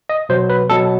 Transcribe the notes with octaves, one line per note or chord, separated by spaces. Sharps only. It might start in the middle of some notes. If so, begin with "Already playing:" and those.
D#5
B2 F#3 C5
B4
B2 F#3 A4